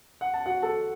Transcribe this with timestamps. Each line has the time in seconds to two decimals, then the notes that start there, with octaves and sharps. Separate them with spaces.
0.21 F#5
0.34 A5
0.46 F#4 F#5
0.62 A4 A5